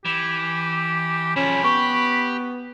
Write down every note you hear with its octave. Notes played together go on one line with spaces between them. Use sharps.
E3 G4
F3 C#4 G#4 B5
B3 G4 C#6